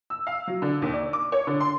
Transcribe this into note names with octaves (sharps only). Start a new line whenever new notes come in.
E6
F5
F#3
D3
D#2
D5
D6
C#5
D3
C6